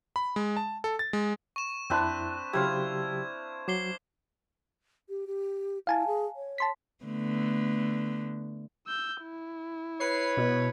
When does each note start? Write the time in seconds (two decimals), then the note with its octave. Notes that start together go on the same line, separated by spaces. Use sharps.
0.16 B5
0.36 G#3
0.57 A5
0.84 A4
0.99 A6
1.13 G#3
1.56 C#6 E7
1.90 F2 C4 D4 E4 B4
2.53 C#3 F#3 E4 G4 C5 F5 G#6
3.68 F#3 D6 C7 G7
5.09 G4
5.27 G4
5.87 E4 F5 G#5 A5
6.07 G#4
6.36 C#5
6.58 A5 C6 B6
7.04 D3 A3 B3
8.87 E6 G6
9.23 E4
10.00 B4 C#5 C7
10.37 B2